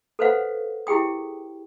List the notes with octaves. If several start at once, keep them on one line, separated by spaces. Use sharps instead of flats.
A4 B4 C5 F5 F#5
E4 G4 G#4 G5 D#6